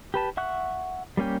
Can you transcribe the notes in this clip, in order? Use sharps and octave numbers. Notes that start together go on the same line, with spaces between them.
G4 B4 A5
E5 F#5 C#6 F#6
G3 A#3 C#4 G4